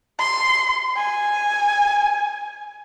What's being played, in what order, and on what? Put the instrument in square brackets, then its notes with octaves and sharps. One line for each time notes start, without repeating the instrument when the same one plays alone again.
[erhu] C6
G#5